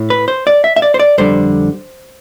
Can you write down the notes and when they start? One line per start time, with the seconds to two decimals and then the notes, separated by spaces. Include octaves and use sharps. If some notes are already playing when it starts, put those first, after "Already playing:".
Already playing: A2
0.10 B4
0.28 C5
0.47 D5
0.64 E5
0.76 E5
0.82 D5
0.94 C5
0.99 D5
1.18 F2 D3 G3 C5